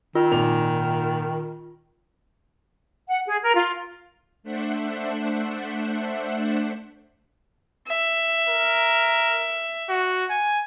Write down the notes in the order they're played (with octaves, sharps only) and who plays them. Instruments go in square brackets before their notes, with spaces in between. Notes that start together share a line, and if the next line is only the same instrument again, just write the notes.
[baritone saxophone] D#3 [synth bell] F4
[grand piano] G#1 A#2 F7
[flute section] F#5
G#4
A#4
F4
[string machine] A3 D4 C5 E5 F#5
[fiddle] E5
[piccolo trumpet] A#4
F#4
G#5